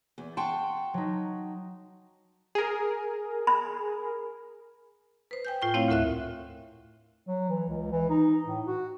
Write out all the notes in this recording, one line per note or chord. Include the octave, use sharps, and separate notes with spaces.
E2
F#5 G5 A5 C6 C#6
F#3 D#4
G#4 A#4
B5
B4 C5
G5 G#5 G6
A2 F4 G5 C#6
A3 C4 E4 C#5 F5
D2 A2 A#4 E5 F#6
F#3
E3
C#2
E3
D#4
A2
F#4